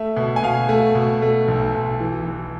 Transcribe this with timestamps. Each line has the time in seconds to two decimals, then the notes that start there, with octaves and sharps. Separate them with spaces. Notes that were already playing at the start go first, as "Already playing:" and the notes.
Already playing: A3 E5
0.17 B2
0.36 G#5
0.43 B2 F5
0.69 A3
0.95 B2
1.22 A3
1.48 B1
1.75 B1
2.00 E3
2.26 E3